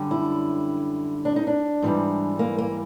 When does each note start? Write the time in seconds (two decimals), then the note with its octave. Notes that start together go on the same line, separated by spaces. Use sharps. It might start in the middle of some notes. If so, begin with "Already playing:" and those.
Already playing: F#2 D3 G3
0.11 E4
1.25 D4
1.36 D#4
1.47 D4
1.82 G#2 E3 G3
2.39 A#3
2.58 A#3